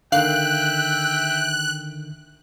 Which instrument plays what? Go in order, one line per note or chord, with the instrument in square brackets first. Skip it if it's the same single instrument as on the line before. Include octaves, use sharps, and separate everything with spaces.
[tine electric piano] D3 D#3 [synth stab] A#3 F5 C7 [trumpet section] E5 G5 [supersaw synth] F#6